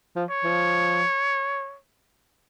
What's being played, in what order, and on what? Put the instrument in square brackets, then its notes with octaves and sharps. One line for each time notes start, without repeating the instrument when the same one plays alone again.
[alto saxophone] F3
[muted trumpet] C#5
[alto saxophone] F3